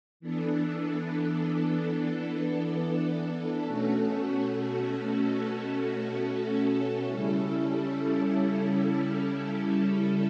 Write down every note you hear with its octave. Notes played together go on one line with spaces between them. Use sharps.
E3 B3 D4 A4
B2 A3 C#4 F#4 A4
C#3 G3 C#4 E4 A4